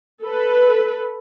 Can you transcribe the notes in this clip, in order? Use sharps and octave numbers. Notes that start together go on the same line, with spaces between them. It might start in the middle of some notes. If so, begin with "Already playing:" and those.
A4 B4